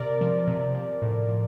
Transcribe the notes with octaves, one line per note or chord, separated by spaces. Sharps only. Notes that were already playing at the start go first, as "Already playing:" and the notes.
Already playing: C3 A#4 D5
F3
C3
F3
A2
F3